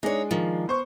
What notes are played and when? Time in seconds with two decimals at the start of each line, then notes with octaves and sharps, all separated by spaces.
0.03 G#3 D4 D#4 C#5
0.31 D#3 F3
0.68 B3 C5 C#6